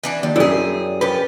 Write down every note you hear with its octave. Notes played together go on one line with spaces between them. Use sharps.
E3 D4 F#4
D#2 G3
F#2 E4 G#4 D5
F3 G4 B4